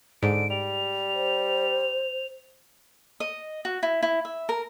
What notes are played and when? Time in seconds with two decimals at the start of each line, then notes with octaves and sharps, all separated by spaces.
0.23 G#2 D3 D7
0.50 G3 F7
1.14 C5
3.20 D#5
3.65 F#4
3.83 E4
4.03 E4
4.25 E5
4.49 A#4